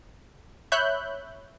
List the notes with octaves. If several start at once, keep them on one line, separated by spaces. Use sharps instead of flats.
C#5 E5 B5 F#6 G6